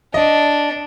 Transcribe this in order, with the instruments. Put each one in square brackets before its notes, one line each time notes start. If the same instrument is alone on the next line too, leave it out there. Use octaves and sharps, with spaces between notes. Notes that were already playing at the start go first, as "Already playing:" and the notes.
[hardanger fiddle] D4 [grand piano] D#5